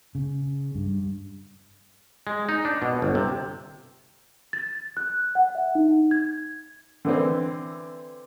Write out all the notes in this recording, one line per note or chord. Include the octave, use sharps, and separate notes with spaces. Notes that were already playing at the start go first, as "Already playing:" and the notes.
C#3
G2
G#3
D#4
D4
B2
G1
C3
A6
F#6
F#5
E5
D#4
G#6
D3 E3 C4